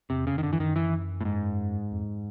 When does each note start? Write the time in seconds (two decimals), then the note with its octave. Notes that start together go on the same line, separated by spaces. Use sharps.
0.10 E2 C3
0.27 F2 C#3
0.38 D#3
0.43 F#2 D3
0.53 E3
0.59 F#2 D#3
0.76 E3
1.21 A2
1.25 G#2
1.91 F2